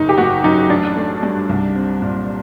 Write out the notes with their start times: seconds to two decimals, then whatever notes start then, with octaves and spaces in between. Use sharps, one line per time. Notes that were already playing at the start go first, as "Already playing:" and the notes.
Already playing: F#1 D#4
0.09 G4
0.18 F#1 F#4
0.44 F#2 D#4
0.70 A1 D4
0.97 A3
1.23 G2
1.49 C2
1.75 C4
2.02 A#2